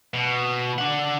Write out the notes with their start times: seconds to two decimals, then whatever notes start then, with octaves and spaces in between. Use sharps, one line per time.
0.14 B2
0.78 D4 F#5